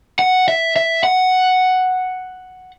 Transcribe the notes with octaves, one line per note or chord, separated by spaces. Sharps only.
F#5
E5
E5
F#5